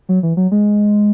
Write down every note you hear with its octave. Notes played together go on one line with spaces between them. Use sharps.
F#3
E3
F#3
G#3